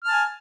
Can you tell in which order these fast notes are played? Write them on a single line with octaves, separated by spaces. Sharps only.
F6 A5 G#5